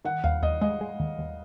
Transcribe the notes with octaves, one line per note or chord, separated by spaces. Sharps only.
D#3 F#5
D#2 F5
D#2 D#5
G#3 D#5
G#3
D#2
D#2